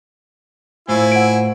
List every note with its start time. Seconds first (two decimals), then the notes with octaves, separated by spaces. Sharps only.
0.89 A2 E4 F4 C5 G#5
1.12 F#5 D7